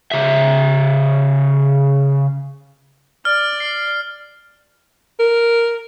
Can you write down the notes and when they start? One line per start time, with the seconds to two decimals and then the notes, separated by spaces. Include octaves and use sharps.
0.11 C#3 E5
3.25 D5 F6
3.60 C7
5.19 A#4